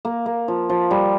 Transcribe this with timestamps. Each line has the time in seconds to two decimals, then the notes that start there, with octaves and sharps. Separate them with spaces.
0.05 A#3
0.26 A#3
0.48 F3
0.69 F3
0.91 G3